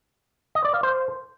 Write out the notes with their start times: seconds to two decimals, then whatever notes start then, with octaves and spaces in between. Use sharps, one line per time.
0.55 D#5
0.65 D5
0.74 F5
0.83 C5